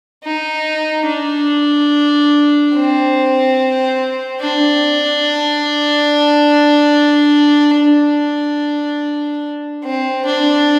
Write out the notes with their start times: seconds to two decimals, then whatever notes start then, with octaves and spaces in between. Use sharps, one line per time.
0.24 D#4
1.07 D4
2.75 C4
4.41 D4
7.75 D4
9.84 C4
10.26 D4